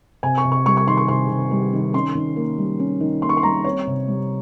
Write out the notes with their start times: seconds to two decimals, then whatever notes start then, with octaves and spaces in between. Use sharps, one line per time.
0.23 C3 G#5
0.38 C#6
0.45 C3
0.52 C#6
0.66 G3 C#6
0.77 C#6
0.87 D#3 C6
0.97 C#6
1.08 C3 C6
1.30 C3
1.51 G3
1.73 D#3
1.93 C#4 C6
2.15 D#3
2.36 A#3
2.58 G3
2.79 C#4
3.00 D#3
3.22 A#3 C6
3.29 C#6
3.37 C6
3.43 G3 A#5
3.64 C4 C#5
3.87 C3
4.08 G3